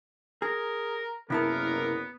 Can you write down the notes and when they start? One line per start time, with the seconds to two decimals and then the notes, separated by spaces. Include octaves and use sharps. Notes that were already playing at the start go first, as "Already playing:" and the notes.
0.42 G#4 A#4
1.30 F#1 C3 B3 E4 A#4 A5